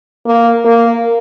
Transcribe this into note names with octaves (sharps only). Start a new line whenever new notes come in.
A#3
A#3